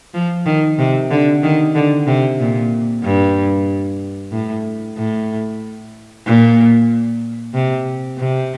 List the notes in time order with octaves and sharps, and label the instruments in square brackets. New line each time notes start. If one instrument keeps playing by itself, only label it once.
[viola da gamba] F3
D#3
C3
D3
D#3
D3
C3
A#2
G2
A2
A2
A#2
C3
C3